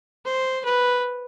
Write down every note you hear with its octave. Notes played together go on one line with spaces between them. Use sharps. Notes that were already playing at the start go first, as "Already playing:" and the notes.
C5
B4